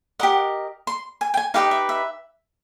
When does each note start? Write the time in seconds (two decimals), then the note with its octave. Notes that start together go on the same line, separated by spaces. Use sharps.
0.19 G4 A#4 D#5 F#5
0.87 C6
1.21 G#5
1.34 G5
1.37 G#5
1.54 D#4 G4 B4 D#5 F5
1.71 E5
1.89 E5